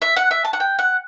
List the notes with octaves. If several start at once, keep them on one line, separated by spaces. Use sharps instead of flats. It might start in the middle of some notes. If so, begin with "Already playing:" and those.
E5
F#5
E5
A5
F#5
G5
F#5